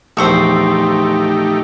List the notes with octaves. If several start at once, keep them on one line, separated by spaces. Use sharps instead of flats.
A#1 E2 A3 D#4 G4 C5 C#6 E6